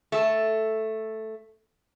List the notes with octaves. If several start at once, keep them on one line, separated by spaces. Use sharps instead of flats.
A3 A4